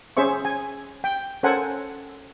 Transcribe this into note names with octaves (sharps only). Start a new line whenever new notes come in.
C#4 G#4 C5 E5 C#6
G#5
G5
C#4 A4 A#4 C5 F#5 G#5